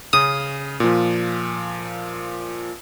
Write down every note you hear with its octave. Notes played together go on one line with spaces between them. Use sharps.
C#3 C#4 D#6
A#2 F3